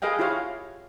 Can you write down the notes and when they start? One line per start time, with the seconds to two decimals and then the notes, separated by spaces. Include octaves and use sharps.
0.02 G#4 B4 D#5 F5 G5
0.19 E4 F4 G4 C#5 F5